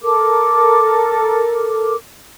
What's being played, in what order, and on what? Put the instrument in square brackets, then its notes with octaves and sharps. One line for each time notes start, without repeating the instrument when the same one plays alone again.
[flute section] A4 A#4 D6